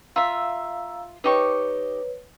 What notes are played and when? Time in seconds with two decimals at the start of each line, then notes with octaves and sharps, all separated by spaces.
0.16 F4 E5 F5 A#5 E6
1.24 D#4 G4 B4 C#5 C#6